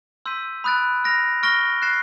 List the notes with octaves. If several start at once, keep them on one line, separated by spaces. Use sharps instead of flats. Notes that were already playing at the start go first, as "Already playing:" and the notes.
C6 E6 G6 B6 D#7
B5 D#6 F#6 A6 D7
F6 A#6 D7 F7
C#6 F6 A#6 D7 G7
F#6 A6 C7 E7